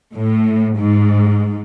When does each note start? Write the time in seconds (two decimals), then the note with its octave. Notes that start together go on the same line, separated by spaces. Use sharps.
0.15 A2
0.77 G#2